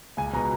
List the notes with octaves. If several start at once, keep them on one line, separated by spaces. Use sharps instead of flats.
C#2 G#5
B2 A#5